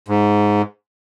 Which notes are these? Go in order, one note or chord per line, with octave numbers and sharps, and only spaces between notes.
G#2